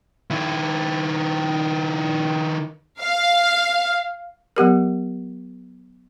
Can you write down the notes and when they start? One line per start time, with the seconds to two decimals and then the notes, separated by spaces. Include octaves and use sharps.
0.30 D#3 E4
3.01 F5
4.56 F#3 B3 G4 A#4